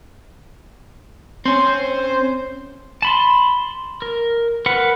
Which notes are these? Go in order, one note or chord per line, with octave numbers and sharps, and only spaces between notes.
C4 C#4 C5
A5 B5 C6
A#4
A#4 B4 F#5